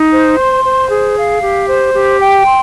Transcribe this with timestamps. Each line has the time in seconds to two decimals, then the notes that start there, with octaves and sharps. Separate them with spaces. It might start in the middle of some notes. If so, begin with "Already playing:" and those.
Already playing: D#4
0.11 C5
0.38 C6
0.64 C5
0.90 G#4
1.16 F5
1.42 G4
1.68 C5
1.94 G4
2.20 G5
2.47 C6